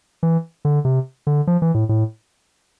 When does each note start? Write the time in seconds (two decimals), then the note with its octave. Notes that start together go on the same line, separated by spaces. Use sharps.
0.23 E3
0.65 D3
0.85 C3
1.27 D3
1.47 F3
1.62 E3
1.74 A2
1.89 A2